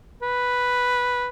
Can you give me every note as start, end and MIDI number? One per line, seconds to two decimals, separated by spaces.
0.23 1.28 71